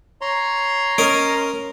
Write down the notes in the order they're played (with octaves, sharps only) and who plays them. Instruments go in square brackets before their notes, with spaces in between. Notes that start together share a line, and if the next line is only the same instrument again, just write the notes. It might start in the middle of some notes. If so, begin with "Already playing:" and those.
[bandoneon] C#5 A#5 C6
[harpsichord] C#4 A#4 D#5